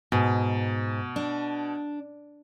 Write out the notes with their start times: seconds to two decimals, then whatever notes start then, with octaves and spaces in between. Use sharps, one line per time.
0.12 G#2 B2
1.16 D4